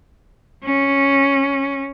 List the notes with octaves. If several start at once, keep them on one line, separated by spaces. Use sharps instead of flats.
C#4